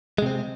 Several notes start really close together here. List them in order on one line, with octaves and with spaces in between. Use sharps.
G#3 C3 C4